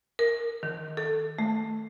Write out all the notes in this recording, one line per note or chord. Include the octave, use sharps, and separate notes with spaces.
A#4
D#3
A4
A3